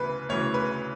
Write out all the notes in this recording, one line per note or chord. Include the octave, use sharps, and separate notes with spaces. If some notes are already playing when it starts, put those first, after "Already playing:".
Already playing: D2 C#3 E3 B4
D2 C#3 E3 C#5
B4